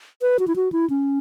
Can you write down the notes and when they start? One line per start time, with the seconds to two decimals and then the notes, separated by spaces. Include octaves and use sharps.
0.22 B4
0.39 F#4
0.48 E4
0.56 F#4
0.72 E4
0.90 C#4